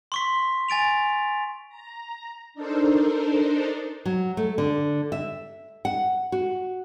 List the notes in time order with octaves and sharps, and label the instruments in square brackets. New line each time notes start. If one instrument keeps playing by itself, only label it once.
[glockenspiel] C6 C#6 B6
G#5 A6 D7 F7
[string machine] A#5
D4 D#4 A4 A#4 C5
[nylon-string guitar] F#3
A3
D3
E5
F#5
F#4